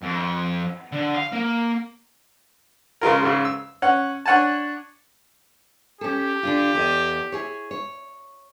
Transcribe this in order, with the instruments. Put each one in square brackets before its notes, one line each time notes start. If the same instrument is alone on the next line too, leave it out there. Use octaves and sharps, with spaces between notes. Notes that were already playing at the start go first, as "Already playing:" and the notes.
[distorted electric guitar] F2
D3
F5
A#3
[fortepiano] C#3 G#3 F4 A#4
G#2 C#3
E6
C#4 F#5
D4 C#5 F#5 G#5 A5
[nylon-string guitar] C#4 A4 [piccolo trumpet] G4
[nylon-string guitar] D3 D4 F4
E2 A4 D#5
E4 G#4 C#5
C#5